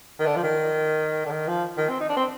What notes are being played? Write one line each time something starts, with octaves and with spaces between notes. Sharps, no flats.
D#3
D3
F3
D#3
D3
D#3
F3
D#3
C4
D#4
D4
C4